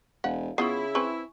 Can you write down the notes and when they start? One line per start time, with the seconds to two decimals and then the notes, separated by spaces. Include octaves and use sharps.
0.24 E1 F5 F#5
0.58 C#3 B3 E4 F4 C#6 D#6 C7
0.95 C4 B4 G#5 C#6